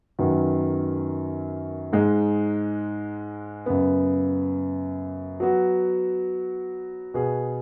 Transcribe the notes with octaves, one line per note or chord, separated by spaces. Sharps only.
F#2 D#3 F#3 B3
G#2 G#3 D#4
F#2 C#3 B3
F#3 B3 F#4
B2 B3 G#4